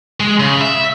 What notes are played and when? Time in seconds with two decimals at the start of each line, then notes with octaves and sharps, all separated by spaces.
0.20 G#3
0.40 C#3
0.61 E5